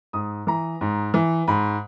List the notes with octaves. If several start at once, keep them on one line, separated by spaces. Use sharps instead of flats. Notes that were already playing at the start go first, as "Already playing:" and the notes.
G#2 D#6
E3 A#5
G#2
E3
G#2 B5